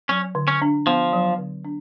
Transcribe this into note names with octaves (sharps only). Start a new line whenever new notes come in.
F#3 C#4
D3
C#4
D4
F3 B3
F#3
D3
D4